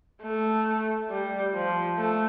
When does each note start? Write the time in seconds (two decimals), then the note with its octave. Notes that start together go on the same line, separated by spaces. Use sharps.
0.22 A3
1.10 G3
1.54 F3
1.98 A3